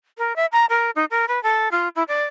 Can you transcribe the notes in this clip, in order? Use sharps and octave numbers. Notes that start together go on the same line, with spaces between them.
A#4
E5
A#5
A#4
D#4
A#4
B4
A4
F4
E4
D5